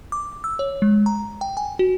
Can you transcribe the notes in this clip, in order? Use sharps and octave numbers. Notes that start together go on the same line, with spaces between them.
D6
E6
C#5
G#3
A#5
G5
G#5
F#4